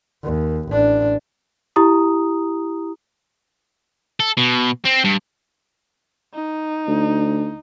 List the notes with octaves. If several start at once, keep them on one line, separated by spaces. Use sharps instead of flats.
D#2
A1 D4
E4 G4 A#5 D#6
A4
B2
C4
G2
D#4
D2